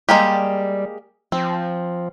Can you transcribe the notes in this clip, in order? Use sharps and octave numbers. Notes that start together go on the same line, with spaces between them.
G3 G#3 A#3 G4
F3 C4